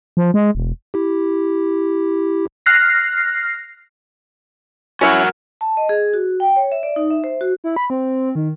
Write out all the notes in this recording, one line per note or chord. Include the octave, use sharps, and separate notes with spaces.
F3
G#3
E1
E4 G4
F6 F#6 A#6 C7
C#4 E4 F#4 A#4 F#5
A5
D#5
G#4
F#4
G5
C#5
E5
D5
D#4
E5
C5
F#4
E4
B5
C4
D#3